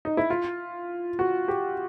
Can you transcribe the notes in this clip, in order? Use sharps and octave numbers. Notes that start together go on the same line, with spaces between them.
D#4
E4
F4
F#4
G4